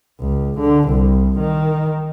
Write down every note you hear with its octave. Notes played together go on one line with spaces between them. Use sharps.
C#2
D3
C2
D#3